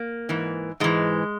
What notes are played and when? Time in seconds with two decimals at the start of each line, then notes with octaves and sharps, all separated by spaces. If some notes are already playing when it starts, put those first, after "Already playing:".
Already playing: A#3
0.29 G#2 E3
0.80 G#2 E3 G#3